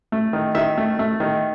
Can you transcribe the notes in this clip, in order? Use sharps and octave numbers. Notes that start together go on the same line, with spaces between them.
A3
D#3
D#3 E5
A3
A3
D#3